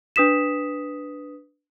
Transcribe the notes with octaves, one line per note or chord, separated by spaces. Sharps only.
D4 B4 D#6 B6 E7